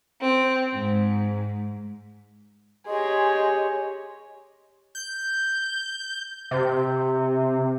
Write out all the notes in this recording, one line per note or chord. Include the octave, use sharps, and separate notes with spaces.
C4
G#2
G4 G#4 C#5 D#5 G#5 C6
G6
C3